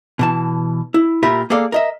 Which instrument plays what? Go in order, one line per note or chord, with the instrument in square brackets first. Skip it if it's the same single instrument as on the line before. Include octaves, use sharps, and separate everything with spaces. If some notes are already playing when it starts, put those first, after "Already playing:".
[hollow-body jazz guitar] B2 E3 A5
E4
A#2 F4 G4 A#4 E5 B5
A#3 G#4 A4 D5 F5
A#4 D#5 E5